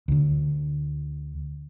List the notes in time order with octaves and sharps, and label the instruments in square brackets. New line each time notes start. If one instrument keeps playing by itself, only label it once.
[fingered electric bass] D2 D3